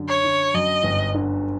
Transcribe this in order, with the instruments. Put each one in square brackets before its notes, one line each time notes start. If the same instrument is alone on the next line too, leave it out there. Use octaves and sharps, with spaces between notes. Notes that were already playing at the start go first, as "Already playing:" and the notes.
Already playing: [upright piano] F#2 D3
[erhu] C#5
[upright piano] D3
[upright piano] F#2 [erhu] D#5
[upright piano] G1
D3